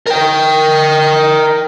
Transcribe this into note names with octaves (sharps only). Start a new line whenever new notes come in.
A#4 G5